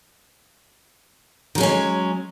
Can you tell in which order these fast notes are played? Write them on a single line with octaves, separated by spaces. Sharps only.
D#3 G#3 C#4 F#3